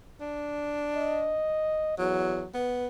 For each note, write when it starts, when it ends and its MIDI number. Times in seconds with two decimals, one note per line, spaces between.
0.21 1.38 62
0.95 1.97 75
1.98 2.43 40
1.98 2.48 54
2.54 2.87 59
2.54 2.85 71